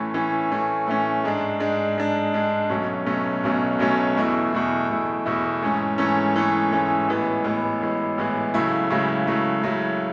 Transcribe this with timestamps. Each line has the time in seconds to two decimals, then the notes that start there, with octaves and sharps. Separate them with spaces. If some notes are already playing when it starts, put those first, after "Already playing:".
Already playing: A2 E3 A3 C#4
0.14 A2 E3 A3 C#4
0.50 A2 E3 A3 C#4
0.87 A2 E3 A3 C#4
1.24 G#2 G#3 D4
1.60 G#2 G#3 D4
1.97 G#2 G#3 D4
2.34 G#2 G#3 D4
2.69 B1 B2 F#3 A3 C#4
3.06 B1 B2 F#3 A3 C#4
3.43 B1 B2 F#3 A3 C#4
3.79 B1 B2 F#3 A3 C#4
4.16 E2 B2 A3 E4
4.52 E2 B2 A3 E4
4.88 E2 B2 A3 E4
5.26 E2 B2 A3 E4
5.62 G#2 E3 A3 C#4
5.98 G#2 E3 A3 C#4
6.36 G#2 E3 A3 C#4
6.72 G#2 E3 A3 C#4
7.08 A1 A2 E3 G#3 B3
7.44 A1 A2 E3 G#3 B3
7.82 A1 A2 E3 G#3 B3
8.18 A1 A2 E3 G#3 B3
8.54 C#2 C#3 F#3 A3 E4
8.90 C#2 C#3 F#3 A3 E4
9.27 C#2 C#3 F#3 A3 E4
9.63 C#2 C#3 F#3 A3 E4